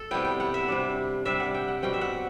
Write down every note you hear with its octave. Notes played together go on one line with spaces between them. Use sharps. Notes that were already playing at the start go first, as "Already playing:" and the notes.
Already playing: A4
C3 G3 B3 E4 G5
G5
F#5
E5
C3 G3 D4
C3 G3 D4 E5
F#5
G5
F#5
B2 G3 C4 G5
E5
F#5